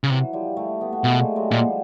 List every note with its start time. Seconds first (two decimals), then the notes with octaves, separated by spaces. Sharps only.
0.03 C#3
0.09 C3 E3 F#3
0.33 F3 G3
0.57 G3 A3
0.81 A3 B3
0.92 A3 B3
1.04 B2 G#3 A#3
1.20 G3 A3
1.36 F#3 G#3
1.51 A#2 F3 G3